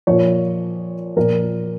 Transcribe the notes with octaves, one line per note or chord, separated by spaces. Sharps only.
A#2 F3 C#5
A#2 F3 A#4